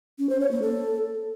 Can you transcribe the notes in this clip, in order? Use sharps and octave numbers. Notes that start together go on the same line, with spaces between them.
C#4
C5
C#5
A#3
A4